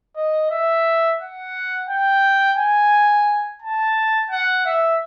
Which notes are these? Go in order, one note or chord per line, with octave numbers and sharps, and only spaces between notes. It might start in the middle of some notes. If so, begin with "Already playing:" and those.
D#5
E5
F#5
G5
G#5
A5
F#5
E5